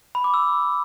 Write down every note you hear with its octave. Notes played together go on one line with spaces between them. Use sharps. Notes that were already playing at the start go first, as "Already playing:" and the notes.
B5
D6
E6